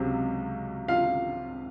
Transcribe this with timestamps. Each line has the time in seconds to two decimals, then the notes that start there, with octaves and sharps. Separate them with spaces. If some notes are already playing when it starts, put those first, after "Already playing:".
Already playing: C#2 C3 F#3
0.88 F4 F5